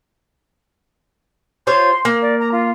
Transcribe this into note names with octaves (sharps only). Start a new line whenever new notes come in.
F4 C5 C#5 C6
A#3
D5
A#5
F4